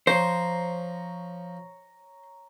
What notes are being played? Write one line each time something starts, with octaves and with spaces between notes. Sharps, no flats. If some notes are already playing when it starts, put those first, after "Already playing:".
F3 C5 C#5 A#5